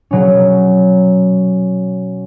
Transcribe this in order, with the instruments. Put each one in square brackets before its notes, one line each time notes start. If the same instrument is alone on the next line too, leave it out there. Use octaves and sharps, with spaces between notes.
[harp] B2 F#3 C#4